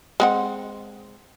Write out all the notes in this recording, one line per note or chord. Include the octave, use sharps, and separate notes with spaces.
G#3 C4 F#5